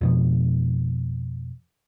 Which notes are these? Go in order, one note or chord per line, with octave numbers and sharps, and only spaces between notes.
F2 B2 F3